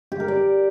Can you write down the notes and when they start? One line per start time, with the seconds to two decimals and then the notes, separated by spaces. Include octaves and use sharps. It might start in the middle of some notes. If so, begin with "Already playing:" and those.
0.12 G4
0.20 A#4
0.28 D5